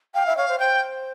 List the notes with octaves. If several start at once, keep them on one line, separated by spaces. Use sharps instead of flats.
F5 G5
E5
C#5 F5
C5
C5 G5